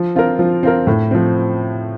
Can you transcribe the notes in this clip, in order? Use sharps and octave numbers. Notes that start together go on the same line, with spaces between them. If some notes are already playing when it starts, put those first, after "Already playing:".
Already playing: F3
C4 F4 A#4
F3
C4 F4 A#4
A2
F3 C4